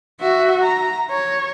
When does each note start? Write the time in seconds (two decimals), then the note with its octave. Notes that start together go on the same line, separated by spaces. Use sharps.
0.21 F#4 E5
0.62 A#5
1.11 C#5